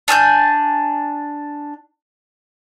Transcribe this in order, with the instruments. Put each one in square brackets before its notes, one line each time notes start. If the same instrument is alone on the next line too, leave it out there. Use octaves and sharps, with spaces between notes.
[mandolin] D4 G#5 E6 G6